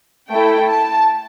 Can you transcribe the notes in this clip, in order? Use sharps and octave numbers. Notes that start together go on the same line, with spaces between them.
A3 E4 A4 G5
A5